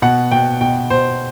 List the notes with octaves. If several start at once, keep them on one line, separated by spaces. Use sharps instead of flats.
B2 F#5
B2 G5
B2 G5
B2 C5